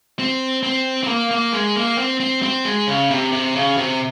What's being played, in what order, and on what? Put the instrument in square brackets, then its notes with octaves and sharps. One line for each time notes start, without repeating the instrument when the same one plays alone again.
[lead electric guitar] C4
C4
C4
A#3
A#3
G#3
A#3
C4
C4
C4
G#3
C#3
C3
C3
C#3
C3